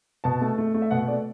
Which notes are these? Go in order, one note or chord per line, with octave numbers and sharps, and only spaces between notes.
B2 A5
A3
A3
A3
E5
B2 F#5
A3 D5